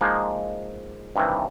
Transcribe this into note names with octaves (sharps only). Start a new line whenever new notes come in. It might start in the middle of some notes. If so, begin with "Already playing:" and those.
F3 G#3 A#3 D#4
G2 C3 D#3 E3